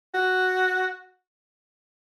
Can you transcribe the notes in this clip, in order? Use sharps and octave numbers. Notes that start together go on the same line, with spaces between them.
F#4